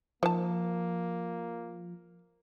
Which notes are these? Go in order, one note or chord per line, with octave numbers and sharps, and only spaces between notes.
D#3 F3 A#3 A5